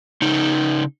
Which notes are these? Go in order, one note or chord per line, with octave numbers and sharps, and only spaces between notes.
C#3 D#4